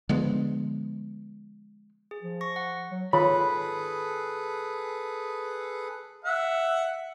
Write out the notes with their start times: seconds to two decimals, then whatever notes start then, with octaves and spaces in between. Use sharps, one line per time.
0.09 D3 F3 G#3 B3
2.11 G#4
2.23 F3
2.41 C#6 A#6
2.56 F#5
2.91 F#3
3.13 D#3 F4 G#4 A4 B4 C#5 B5
6.24 E5 F#5